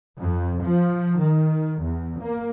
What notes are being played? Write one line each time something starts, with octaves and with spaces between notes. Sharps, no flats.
F2
F3
D#3
E2
A#3